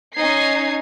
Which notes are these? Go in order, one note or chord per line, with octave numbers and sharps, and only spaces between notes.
C#4 D#4 G#6 C7